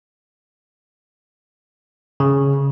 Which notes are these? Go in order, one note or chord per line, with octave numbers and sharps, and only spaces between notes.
C#3